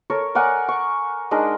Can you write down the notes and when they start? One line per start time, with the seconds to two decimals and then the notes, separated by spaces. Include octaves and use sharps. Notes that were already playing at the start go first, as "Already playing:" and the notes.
0.10 A4 A#4 C#5
0.35 A#4 D5 F#5 G#5
0.68 C#6
1.31 G#3 D4 D#4 A#4